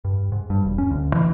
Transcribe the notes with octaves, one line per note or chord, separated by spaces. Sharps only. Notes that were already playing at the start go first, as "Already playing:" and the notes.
G2
G#2
G2
E1
C#4
D2
E3